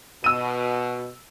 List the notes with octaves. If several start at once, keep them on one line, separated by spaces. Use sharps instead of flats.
B2 E6 D#7